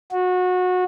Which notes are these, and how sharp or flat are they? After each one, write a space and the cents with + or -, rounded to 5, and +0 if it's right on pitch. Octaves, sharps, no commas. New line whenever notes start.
F#4 -25